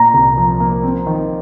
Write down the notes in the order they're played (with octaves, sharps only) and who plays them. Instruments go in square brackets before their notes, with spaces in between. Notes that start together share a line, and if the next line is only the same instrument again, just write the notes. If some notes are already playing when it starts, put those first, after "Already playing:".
Already playing: [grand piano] A#2 [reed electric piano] A#5
[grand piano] C2
F3
A#3
C4
D#3